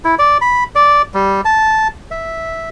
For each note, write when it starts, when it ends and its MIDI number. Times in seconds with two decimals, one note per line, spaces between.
0.05 0.15 64
0.19 0.38 74
0.41 0.64 83
0.75 1.02 74
1.14 1.41 55
1.45 1.88 81
2.11 2.69 76